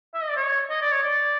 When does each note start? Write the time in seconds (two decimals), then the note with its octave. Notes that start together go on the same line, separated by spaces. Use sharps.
0.14 E5
0.22 D#5
0.29 D5
0.36 C#5
0.70 D#5
0.81 D5
0.91 C#5
1.03 D5